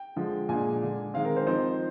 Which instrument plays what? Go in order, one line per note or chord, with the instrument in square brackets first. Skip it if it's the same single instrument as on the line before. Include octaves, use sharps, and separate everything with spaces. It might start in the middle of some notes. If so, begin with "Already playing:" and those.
Already playing: [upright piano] G5
D3 F3 G#3
A#2 G#3 D4 G#5
D3 G#3 D4
D#3 G#3 C4 F5
A#4
C5
F3 C4 D#4 C5